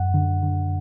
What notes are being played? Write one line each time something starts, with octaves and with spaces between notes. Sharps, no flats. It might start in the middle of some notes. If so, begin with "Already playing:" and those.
Already playing: F#2 F#5
D3
D3